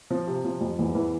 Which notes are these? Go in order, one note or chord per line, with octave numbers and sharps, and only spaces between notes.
F3
C3
F3
F2
E2
E3